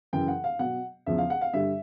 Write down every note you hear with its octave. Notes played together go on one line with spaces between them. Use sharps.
F#2 C#3 E3 G5
F#5
F5
B2 F#3 F#5
E2 C#3 F3 E5
F5
F#5
F5
G2 D3 G3 E5